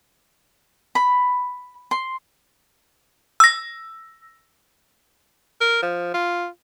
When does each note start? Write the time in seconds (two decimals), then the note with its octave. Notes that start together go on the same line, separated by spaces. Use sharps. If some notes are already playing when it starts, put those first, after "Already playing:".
0.95 B5
1.91 C6
3.40 E6 A#6
5.61 A#4
5.82 F3
6.14 F4